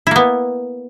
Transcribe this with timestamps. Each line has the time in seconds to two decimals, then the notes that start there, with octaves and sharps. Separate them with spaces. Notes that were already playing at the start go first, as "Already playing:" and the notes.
0.07 E4
0.11 A#3
0.16 B3